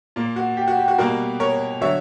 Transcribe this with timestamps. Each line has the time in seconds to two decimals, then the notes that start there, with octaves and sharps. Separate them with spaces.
0.16 A#2 A#3
0.36 F#4
0.57 G4
0.68 F#4
0.79 G4
0.88 F#4
0.98 B2 G3 A#3 F#4 A#4
1.40 A#4 C#5
1.81 D3 F#3 C#5 E5